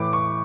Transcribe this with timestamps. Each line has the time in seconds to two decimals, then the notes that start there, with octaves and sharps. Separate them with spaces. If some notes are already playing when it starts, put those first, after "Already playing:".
Already playing: A2 E3 D6
0.13 C#6